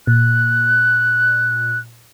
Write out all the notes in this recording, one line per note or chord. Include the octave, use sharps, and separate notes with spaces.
A#2 F#6